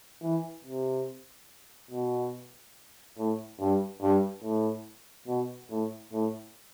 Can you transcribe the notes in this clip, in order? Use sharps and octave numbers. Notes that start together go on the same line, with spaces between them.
E3
C3
B2
A2
G2
G2
A2
B2
A2
A2